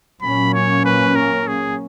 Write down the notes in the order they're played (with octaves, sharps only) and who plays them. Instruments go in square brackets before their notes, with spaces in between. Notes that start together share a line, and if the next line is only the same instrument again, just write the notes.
[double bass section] A#2 F#3 A#3 C#4 [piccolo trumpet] B5
[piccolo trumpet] C#5
B4
A#4
G#4